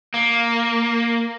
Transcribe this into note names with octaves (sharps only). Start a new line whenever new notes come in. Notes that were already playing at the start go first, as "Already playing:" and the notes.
A#3